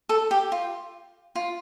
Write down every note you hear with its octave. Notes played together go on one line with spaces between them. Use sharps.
A4
G4
F4
F4